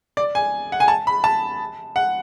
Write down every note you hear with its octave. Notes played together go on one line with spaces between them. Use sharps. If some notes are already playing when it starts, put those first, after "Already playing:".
D5
G#5
F#5
G#5
A5
B5
A5
F#5